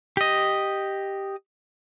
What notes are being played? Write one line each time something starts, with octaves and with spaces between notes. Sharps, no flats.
G4 D#5